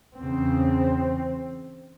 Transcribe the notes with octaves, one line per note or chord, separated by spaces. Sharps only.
E2 C4
C#3